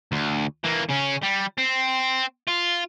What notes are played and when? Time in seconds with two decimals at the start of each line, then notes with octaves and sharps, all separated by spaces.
0.12 D2
0.64 E3 A#3
0.89 C#3 C#4
1.23 G3
1.58 C4
2.48 F4